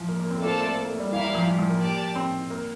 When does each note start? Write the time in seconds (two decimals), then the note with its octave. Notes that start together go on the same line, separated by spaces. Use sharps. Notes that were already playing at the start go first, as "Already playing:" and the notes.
Already playing: E3 F3
0.08 A#3
0.20 A#3
0.30 C4
0.38 A3
0.42 A#3 C4 F4 A4 D5 A5
0.60 A3
0.77 A#3
0.89 A3
1.00 G3
1.12 E3 E4 A#4 F5
1.24 G3
1.35 F3
1.47 E3
1.58 F3
1.69 A#3
1.81 G4 D5 A5
2.15 C4
2.50 A#3